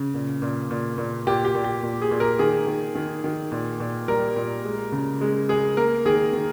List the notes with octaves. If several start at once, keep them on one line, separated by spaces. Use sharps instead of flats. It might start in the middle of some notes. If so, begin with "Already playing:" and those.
Already playing: C#3
A#2
A#2
A#2
A#2
A#2 G4
G4
A#2
G4
A#2
G#4
A#2
A#4
D#3 G#4
D#3
D#3
D#3
A#2
A#2
G3 A#4
A#2
G#3
C#3
G#3
G#3 G#4
A#3 A#4
D#3 G#4
D#3